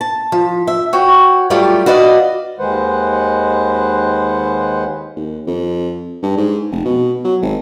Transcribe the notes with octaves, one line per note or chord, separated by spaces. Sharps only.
A5
F3
E5
F#4 C#5 G5
F#3 G3 A3 F4 G4
F#4 B4 D5 D#5 F5
D#2 D#3 G#3 B4 C5 F#5
D#2
F2
G2
G#2
F1
B2
F#3
G#1